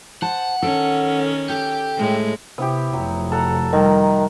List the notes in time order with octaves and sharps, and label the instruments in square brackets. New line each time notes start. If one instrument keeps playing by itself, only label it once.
[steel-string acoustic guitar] C5 A5 [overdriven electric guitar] F#5
[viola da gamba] D#3 C#4 [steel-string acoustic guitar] A4
[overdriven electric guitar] G4 [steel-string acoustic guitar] A4
[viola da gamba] A2 G#3
[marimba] C3 [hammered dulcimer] B3 E4 G4
[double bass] F1 [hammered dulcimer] F#3
[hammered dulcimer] A4 F#5 A#5
[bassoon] D#3 [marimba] G3 [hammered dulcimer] A#4